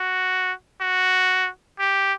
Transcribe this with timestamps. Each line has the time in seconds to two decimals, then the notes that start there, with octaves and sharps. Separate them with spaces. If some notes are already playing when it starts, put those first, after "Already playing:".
Already playing: F#4
0.82 F#4
1.80 G4